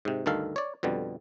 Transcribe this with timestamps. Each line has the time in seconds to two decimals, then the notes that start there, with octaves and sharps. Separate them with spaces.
0.05 G#2 C3
0.26 D2 G2 D#3 A4 F5
0.56 C#5 D5
0.83 F2 B2 D3 G3